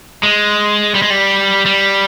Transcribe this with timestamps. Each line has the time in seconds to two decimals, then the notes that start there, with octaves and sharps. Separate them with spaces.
0.23 G#3
0.95 G3
1.02 G#3
1.10 G3
1.65 G3